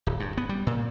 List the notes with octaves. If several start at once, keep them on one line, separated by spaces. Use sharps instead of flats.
D1
G2
B3
G3
A#2